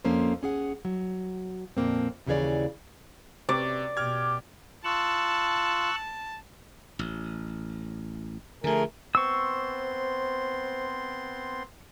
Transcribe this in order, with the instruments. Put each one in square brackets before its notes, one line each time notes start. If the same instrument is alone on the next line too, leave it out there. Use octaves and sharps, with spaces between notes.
[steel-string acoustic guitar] F2 F3 A#3 C#4 A4 C5
D#2 C#4 G#4 F#5
F#3
F2 A#2 A#3 C4
D#2 C#3 E3 G#4 C#5 D5
[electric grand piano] C3 [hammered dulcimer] D5
[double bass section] B2 [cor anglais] G4 [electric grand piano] F6 G#6
[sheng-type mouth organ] F4 [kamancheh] A5 [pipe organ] C#6 E6 F#6
[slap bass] A1
[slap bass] D3 F3 [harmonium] A3 G#4 A#4
[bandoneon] B3 C4 C6 [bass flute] C5 [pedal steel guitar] C#6 E6